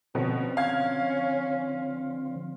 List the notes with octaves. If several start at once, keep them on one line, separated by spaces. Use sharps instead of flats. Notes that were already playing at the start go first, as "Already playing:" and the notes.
B2 D3 F3 C4 C#4
F5 G#6